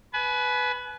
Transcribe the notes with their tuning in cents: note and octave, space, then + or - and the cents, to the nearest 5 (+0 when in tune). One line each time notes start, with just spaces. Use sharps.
B4 +0 G#5 +40